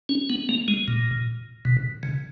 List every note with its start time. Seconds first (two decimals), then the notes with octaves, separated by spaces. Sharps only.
0.09 C#4
0.30 B3
0.49 A#3
0.68 G#3
0.88 A#2
1.65 B2
2.03 C#3